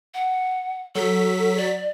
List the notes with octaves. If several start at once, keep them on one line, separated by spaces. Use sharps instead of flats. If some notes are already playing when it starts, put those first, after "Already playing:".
F#5
F#3 A4 B6
D5